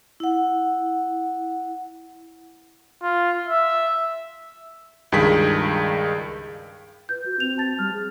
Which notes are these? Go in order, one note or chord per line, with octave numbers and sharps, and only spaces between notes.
E4 F#5
F4
E5
C#2 G2 D#3 G#4 B6
B4 G6
F#4
C4 F7
A5 A6
G3 F6
G#4